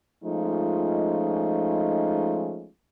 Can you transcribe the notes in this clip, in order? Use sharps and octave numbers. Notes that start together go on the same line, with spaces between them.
F3 G#3 A3 C#4 D#4 F4